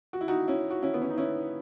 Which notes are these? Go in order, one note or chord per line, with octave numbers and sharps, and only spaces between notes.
F#4
E4
D#4 F#4
C#4 E4
F#4
C#4 E4
B3
C#4
D#4
C#4 E4